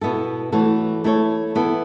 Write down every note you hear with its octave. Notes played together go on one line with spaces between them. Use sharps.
B2 B3 E4 A4
E3 A3 F#4 A4 C#5
A3 E4 A4 C#5
E3 B3 E4 A4